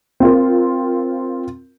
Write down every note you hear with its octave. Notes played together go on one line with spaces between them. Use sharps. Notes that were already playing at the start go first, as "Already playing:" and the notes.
C4 F4 A#4